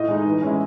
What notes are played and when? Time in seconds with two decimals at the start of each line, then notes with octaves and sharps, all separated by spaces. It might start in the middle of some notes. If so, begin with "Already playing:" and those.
Already playing: A2 D#5
0.08 G#3 D#4
0.25 E3
0.42 G#3 C#4 E4